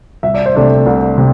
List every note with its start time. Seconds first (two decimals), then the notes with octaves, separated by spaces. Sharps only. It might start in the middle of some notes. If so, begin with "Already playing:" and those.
0.23 C2 E5
0.34 D5
0.46 C5
0.55 C3 A3 D4 D5
0.86 C2
1.18 C3